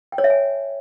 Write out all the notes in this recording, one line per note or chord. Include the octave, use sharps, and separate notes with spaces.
G5
C#5
E5
G#5